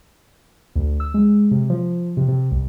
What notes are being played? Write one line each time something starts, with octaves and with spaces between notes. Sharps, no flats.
D2
E6
G#3
C3
F3
C3
C3
C2